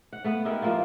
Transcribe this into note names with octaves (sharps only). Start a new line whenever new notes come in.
F#5
A3 B3 F#5
D#4 E4 G4 A#4
F3 A#3 E4 F4